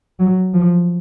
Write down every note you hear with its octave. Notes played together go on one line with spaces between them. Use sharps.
F#3
F3